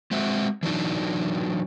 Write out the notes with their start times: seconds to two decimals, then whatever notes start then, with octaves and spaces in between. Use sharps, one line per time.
0.11 G#3 C4 F#4 E5
0.63 E3 F#3 D4 D#4